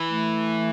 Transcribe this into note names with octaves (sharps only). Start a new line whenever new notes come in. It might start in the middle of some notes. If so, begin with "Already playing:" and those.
Already playing: E3
A3